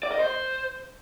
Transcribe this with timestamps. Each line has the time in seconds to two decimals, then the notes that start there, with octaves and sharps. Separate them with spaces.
0.03 D5
0.12 D#5
0.20 C5